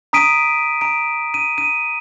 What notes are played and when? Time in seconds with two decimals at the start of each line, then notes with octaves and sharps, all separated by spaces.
0.13 A#5 D#6 B6 D7 D#7
0.81 A#5 D7
1.34 D#7
1.58 D#7